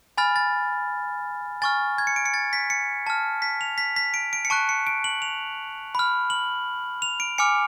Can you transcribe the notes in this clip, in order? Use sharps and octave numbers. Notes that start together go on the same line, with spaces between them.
G#5 B5 F6 A6
A6
G#5 C#6 F6 A6
G#6
C#7
D7
C#7
A6
B6
C#7
A5 F6
B6
F7
B6
B6
D7
D7
C#7
A5 C#6 F#6 D7
C#7
D7
F#7
F7
B5 F6
F#7
F7
D7
G#5 D6 F6 C#7